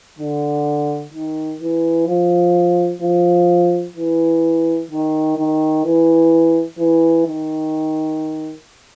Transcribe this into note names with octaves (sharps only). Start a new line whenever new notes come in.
D3
D#3
E3
F3
F3
E3
D#3
D#3
E3
E3
D#3